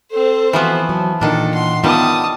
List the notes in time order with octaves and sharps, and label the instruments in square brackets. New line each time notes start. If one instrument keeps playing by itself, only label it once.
[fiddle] C4 C5 [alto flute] A4
[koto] E3 F3 B3 [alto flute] F#4
[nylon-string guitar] F#3 [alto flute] A5
[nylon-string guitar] A#2 E3 [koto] D#3 D4 [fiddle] A4
[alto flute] F#5 [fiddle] C6
[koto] D#3 G3 E4 [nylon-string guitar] B3 C#4 F4 [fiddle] A5 D#6